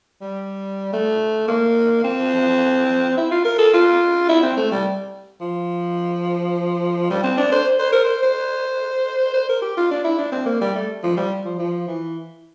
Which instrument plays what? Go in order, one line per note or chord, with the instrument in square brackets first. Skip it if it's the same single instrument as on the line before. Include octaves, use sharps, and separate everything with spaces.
[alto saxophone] G3
A3
A#3
C4
E4
F4
A#4
A4
F4
E4
C4
A3
G3
F3
G3
C4
D4
C5
C5
A#4
C5
C5
C5
A#4
G4
F4
D4
E4
D4
C4
A#3
G3
A3
F3
G3
F3
F3
E3